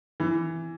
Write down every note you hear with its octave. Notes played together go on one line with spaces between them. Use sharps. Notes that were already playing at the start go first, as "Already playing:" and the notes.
E3